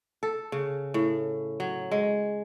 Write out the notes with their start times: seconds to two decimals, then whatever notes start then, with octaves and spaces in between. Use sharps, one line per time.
0.23 A4
0.52 C#3
0.94 A2
1.60 F#3
1.91 G#3